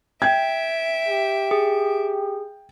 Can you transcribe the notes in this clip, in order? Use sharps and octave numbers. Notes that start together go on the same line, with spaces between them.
E5 G5 G#6 D7
G4
G#4